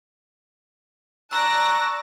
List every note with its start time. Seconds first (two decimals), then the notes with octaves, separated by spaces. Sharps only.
1.31 D5 A5 A#5 C#6 E6 F#6 A#6